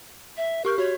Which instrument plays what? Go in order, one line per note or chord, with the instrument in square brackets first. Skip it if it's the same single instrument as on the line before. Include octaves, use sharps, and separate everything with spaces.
[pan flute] E5
[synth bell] G4 C#6 G6 [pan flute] A#4
[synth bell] F#4 [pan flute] C#5